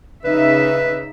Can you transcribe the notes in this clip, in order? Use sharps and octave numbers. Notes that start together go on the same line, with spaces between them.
C#3 D#4 B4 E5